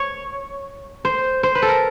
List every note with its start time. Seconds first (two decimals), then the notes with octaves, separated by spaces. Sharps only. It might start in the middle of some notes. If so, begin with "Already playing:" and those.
Already playing: C#5
1.05 C5
1.43 C5
1.55 B4
1.62 A4
1.68 A#4